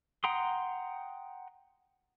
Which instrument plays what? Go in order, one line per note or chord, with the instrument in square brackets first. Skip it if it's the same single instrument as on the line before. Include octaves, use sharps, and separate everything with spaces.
[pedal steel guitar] F#5 G5 A#5 C6 D#6